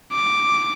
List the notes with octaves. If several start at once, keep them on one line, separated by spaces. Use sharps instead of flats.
D6